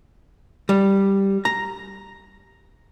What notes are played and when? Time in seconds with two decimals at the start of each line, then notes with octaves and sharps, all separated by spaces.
0.69 G3
1.45 A#5